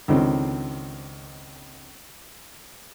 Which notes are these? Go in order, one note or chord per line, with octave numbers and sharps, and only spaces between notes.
C#2 D3 D#3 C4